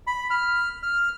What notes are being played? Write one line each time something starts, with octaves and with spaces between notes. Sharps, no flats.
B5
F6
F6